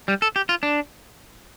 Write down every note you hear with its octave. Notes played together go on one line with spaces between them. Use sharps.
G3
A4
G4
F4
D4